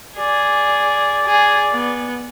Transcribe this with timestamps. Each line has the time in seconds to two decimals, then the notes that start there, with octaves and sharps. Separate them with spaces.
0.18 G#4 D5
1.26 G#4
1.72 B3